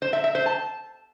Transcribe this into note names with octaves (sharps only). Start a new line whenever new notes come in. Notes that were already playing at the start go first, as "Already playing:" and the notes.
C5
E5
E5
C5
A5